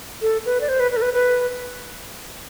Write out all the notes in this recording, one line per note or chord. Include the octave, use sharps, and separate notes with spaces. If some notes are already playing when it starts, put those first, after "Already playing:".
A4
B4
D5
C5
B4
B4
A4
B4
B4